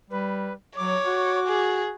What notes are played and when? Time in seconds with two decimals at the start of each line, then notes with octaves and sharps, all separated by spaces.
0.10 G3 B4
0.77 F#3 C#5 D6
1.06 F#4
1.47 G#4